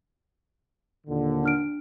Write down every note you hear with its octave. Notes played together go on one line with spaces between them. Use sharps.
D#2 A#2 D3
D4 F6 D7